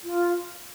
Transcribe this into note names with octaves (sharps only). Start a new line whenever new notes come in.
F4